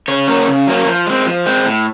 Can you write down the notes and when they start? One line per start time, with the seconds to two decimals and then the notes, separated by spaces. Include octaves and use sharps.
0.08 C#3 C#5
0.28 F#3 A#3 C#4
0.47 C#3
0.67 F#3 A#3 C#4
0.87 F3
1.06 G#3 C4
1.26 F3
1.46 G#3 C4
1.66 A2